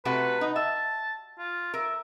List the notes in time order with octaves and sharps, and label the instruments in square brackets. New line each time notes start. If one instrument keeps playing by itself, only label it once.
[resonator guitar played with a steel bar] C3 A3 F#4 [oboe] B4
[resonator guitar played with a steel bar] D#4
[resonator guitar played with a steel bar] E5 [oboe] A5
[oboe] F4
[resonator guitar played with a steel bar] A#4 [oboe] E5